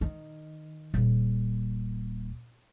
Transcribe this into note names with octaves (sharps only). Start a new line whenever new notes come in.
D#3
D#1